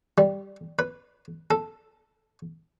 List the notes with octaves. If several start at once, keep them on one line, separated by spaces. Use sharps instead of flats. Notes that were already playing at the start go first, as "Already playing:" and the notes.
G3
B4
A4